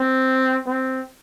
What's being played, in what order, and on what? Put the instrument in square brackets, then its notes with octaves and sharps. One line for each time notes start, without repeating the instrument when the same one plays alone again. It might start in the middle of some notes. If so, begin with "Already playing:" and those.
Already playing: [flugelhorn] C4
C4